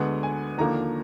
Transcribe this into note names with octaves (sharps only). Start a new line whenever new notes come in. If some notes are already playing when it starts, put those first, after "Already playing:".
Already playing: D2 D3 G#3 B3 F#5
G#5
D#2 D3 F3 A#3 A#5